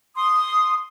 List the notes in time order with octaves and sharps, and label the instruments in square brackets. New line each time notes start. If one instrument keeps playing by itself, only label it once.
[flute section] C6 D#6